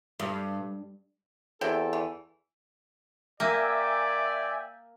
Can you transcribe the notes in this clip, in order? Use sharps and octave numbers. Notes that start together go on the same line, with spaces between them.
G2
E2 C3 E4 A4 G5
E3
A#3 D5 E5 G5 G#5